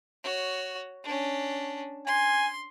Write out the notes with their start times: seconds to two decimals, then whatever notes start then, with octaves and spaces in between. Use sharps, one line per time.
0.24 F#4 C#5
1.04 C#4 D4
2.07 G#5 C6